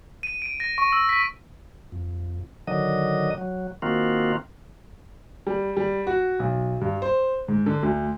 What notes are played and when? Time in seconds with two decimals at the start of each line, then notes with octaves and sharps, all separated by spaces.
0.23 D#7
0.42 D7
0.60 A#6
0.78 C#6
0.92 E6
1.09 B6
1.92 F2
2.67 D3 D#3 F#3 D#5
3.38 F#3
3.82 D#3 A#3 C4 F4 F#4
5.47 G3
5.77 G3
6.07 F#4
6.39 B1
6.81 G2
7.02 C5
7.48 G#2
7.66 D3
7.83 D2